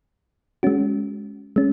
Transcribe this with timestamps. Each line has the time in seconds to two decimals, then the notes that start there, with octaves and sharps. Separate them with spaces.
0.63 G#3 C#4 F#4
1.56 G#3 C#4